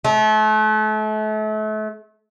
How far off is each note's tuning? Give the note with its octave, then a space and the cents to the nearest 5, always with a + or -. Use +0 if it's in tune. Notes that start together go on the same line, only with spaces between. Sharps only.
A3 -35